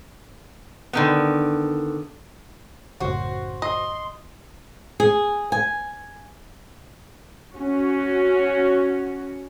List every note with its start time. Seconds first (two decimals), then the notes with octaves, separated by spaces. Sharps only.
0.93 D3 D#3 B3
3.00 A1 F#2 C#3 F#4 C5
3.62 D#5 C6
5.00 G#4
5.52 G#5
7.53 C#4 F#4